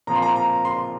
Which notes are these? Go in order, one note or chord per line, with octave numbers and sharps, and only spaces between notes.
A#2 F3 C4 F4 A#5
C6
A#5
A#5
C6